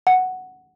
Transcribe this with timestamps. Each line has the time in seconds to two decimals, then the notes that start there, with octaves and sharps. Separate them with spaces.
0.07 F#5